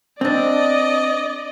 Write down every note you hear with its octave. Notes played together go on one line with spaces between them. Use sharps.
C4 D4 D5 D#5